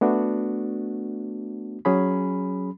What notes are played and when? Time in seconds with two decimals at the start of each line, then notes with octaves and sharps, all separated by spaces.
0.01 A3 B3 D4 F#4
1.85 F#3 C#4 G#4 B5